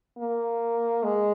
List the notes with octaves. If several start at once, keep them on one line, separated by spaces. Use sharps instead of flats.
A#3
G#3